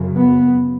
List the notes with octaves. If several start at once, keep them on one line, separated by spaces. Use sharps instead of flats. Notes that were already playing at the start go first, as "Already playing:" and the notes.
Already playing: F#2 C#3
B3